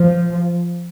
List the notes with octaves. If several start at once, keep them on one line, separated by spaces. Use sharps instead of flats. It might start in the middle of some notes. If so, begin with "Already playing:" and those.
Already playing: F3